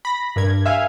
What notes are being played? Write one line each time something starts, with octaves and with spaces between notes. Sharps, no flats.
B5 A#6
G2 A#4 G#6
E5 F5 G#5